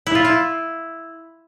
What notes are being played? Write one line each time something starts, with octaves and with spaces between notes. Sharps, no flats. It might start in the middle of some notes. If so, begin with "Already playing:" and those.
E4
F4
E4